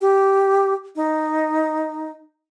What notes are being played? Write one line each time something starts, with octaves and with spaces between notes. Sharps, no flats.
G4
D#4